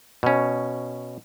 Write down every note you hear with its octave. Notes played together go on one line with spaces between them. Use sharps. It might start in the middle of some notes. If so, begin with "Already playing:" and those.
B2 C#4